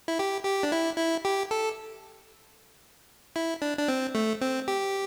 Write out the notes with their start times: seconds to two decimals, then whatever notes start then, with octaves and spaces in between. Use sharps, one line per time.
0.08 E4
0.19 G4
0.45 G4
0.63 D4
0.72 E4
0.98 E4
1.25 G4
1.51 A4
3.36 E4
3.62 D4
3.78 D4
3.88 C4
4.15 A3
4.41 C4
4.68 G4